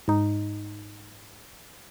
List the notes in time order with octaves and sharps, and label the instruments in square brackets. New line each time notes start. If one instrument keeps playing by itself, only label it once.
[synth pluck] G#2 D#4